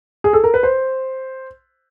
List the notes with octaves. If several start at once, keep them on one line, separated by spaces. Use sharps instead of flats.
G#4
A4
A#4
B4
C5